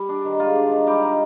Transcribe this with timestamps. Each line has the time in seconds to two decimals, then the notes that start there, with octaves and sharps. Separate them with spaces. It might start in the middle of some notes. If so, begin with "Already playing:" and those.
Already playing: G3
0.09 D4
0.25 D#3
0.40 G#3 F4
0.56 D4
0.72 D#3
0.87 G3 D#4 G4
1.02 D#4